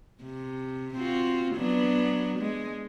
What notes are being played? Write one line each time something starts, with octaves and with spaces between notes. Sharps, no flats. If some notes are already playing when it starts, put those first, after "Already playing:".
C3
C4 F4 F#4
F#3 B3 D4
G#3